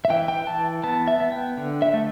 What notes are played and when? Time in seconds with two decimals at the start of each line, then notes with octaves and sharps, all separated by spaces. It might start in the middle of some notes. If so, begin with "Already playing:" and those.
0.05 E5
0.10 E3 G5
0.28 G5
0.46 E3 A5
0.84 B3 A5
1.08 E5
1.20 B3
1.32 G5
1.57 D3
1.82 E5
1.94 A3